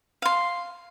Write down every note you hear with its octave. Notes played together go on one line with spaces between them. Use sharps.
F5 C6